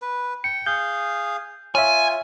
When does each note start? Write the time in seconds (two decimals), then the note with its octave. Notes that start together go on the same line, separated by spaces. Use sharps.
0.02 B4
0.44 G5 C#7
0.66 G#4 F5 G6
1.75 F4 C#5 E5 G#5